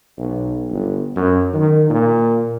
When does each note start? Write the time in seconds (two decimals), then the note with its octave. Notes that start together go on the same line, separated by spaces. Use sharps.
0.18 B1
0.71 G1
1.16 F#2
1.54 D#3
1.90 A#2